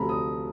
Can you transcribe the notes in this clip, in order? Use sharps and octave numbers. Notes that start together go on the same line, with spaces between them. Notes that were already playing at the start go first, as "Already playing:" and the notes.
Already playing: D2 C3 F3 A3 A#5 B5
D#6